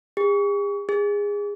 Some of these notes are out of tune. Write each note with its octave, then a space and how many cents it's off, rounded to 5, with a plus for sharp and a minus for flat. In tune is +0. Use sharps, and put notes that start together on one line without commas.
G#4 -45
G#4 -20